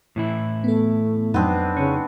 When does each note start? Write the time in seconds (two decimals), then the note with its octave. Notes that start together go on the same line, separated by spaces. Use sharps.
0.16 A2 E3 E4
0.64 A3 B3 A4
1.34 F2 F#3 B3 C4 D4 D#4
1.77 C#3 C#4